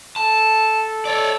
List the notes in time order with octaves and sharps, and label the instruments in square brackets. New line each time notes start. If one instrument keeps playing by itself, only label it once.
[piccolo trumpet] A4 [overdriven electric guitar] A5
[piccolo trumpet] A4 [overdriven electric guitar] C#5 D5